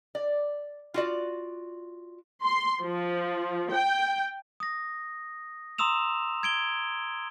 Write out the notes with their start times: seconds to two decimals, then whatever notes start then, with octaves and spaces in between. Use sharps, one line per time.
0.15 D5
0.94 F4 F#4 D5
2.43 C6
2.83 F3
3.72 G5
4.60 D#6 A#6
5.78 A#5 C6 D#6 E6 E7 F7
6.43 G#6 D7 G7